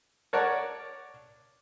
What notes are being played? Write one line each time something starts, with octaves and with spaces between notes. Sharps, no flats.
A#4 C#5 D5 F#5 A5